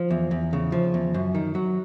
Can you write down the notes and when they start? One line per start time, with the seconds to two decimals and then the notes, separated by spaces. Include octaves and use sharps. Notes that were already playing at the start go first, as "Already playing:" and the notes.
Already playing: F3
0.10 E2
0.31 E2
0.53 C#3
0.72 F3
0.94 E2
1.14 F#2
1.35 D#3
1.55 F#3